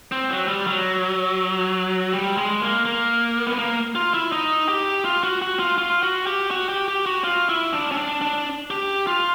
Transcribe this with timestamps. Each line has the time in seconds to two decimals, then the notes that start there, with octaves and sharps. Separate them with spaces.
0.12 C4
0.30 F#3
0.48 G3
0.67 F#3
2.13 G3
2.37 G#3
2.61 A#3
2.85 A#3
3.46 B3
3.59 A#3
3.95 F4
4.14 E4
4.32 D#4
4.69 G4
5.05 F4
5.24 F#4
5.42 F#4
5.59 F4
5.78 F4
6.03 F#4
6.27 G4
6.51 F#4
6.69 G4
6.88 G4
7.06 F#4
7.24 F4
7.49 E4
7.73 D4
7.91 C#4
7.97 D4
8.21 D4
8.70 G4
9.07 F4